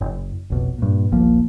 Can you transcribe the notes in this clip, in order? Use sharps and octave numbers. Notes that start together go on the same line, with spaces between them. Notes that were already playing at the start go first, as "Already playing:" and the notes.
F#1
F1 B1
G2 A#2
D#1 A#1 F3 A#3